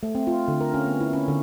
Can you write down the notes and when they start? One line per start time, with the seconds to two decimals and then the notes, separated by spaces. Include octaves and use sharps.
0.03 A3
0.15 C4
0.27 F4
0.48 D3
0.61 A#4
0.74 C#4
0.86 B3
1.01 E4
1.13 C#4
1.28 D3